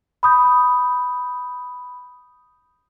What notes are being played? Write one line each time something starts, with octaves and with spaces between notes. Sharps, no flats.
B5 D#6 G6